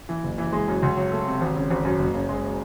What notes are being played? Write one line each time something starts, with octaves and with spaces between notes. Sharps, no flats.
E3
F#1
E3
G#3
F#2
C#2
F#3
A3
C3
G#1
C#3
G#1
F#2
F#1
C#3
G#3